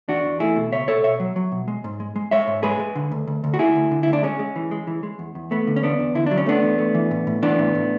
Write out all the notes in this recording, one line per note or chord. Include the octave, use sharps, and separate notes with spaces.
E2 D4 F#4
E2
A3 E4 G#4
B2
C#2 C#5 E5
B2 A4 C#5
B2 C#5 E5
F#3
F#3
B2
G#3
G#2
G#3
G#3
G#3 C#5 E5
G#2
G#3 G#4 B4
G#3
D3
D2
D2
D2
F#4
D2 E4 G#4
D2
D3
E4
D2
D4
G#3 C#4
G#3
E3
G#3
E3
G#3
E2
E2
A3 B3
D3
C#4
E2 B3 D4
E2
D3 E4
F#3 D4
C#4
A3 B3 D4
E2
A3
E3
A2
A2
E3 B3 D4
A2
A2